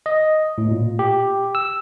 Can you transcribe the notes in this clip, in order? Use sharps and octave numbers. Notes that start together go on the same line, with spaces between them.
D#5
A2
A#2
G4
E6